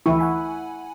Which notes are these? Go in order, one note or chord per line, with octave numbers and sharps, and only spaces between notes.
D2 E3 E4 C#6
F#5 G#5 B5